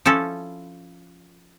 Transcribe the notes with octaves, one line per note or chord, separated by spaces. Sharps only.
F3 C#4 E4 A4